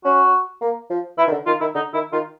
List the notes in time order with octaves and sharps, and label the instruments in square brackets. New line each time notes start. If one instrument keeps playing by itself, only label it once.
[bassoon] C#4 [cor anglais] F#4
[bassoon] A#3
F3
[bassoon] E3 [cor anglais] E4
[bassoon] D#3
D3
[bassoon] D#3 [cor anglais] F4
[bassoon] D#3 [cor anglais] E4
[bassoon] D3 [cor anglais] D#4
[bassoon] D#3 [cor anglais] E4
[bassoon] D#3 [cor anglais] F4